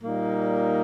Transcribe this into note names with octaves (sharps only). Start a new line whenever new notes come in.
A#2 G3 A#3 D#4